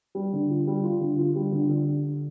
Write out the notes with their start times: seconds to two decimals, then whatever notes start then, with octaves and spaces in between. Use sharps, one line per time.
0.15 G3
0.33 D3
0.50 F4
0.67 G3
0.83 F4
1.01 D3
1.19 F4
1.36 G3
1.52 D3
1.69 D3